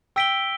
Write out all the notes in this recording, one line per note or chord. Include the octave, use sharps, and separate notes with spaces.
G5 E6 B6 D7 G7